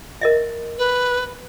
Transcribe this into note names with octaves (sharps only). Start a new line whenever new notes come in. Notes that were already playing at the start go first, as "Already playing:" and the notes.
A#4 D#5 E5
B4